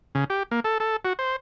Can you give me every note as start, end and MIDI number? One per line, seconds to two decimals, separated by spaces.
0.15 0.24 49
0.30 0.43 67
0.51 0.60 58
0.64 0.78 69
0.80 0.96 69
1.05 1.13 66
1.19 1.36 72